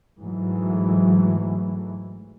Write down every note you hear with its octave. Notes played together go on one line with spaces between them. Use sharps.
G#2 E3 F#3 A3